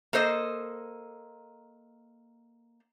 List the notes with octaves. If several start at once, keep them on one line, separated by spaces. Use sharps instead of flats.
A#3 A4 C5 D#5